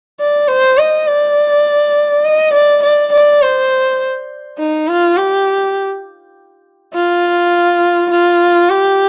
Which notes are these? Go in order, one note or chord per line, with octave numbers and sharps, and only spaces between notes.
D5
C5
D#5
D5
D#5
D5
D5
D5
C5
D#4
F4
G4
F4
F4
G4